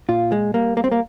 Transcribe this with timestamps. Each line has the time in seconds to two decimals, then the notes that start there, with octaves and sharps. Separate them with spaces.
0.09 A#2 F4
0.32 G#3
0.54 G3 A#3
0.77 A#3
0.84 C4
0.91 A#3